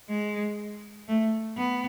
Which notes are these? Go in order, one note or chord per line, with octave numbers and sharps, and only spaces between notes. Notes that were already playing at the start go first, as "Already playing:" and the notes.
G#3
A3
B3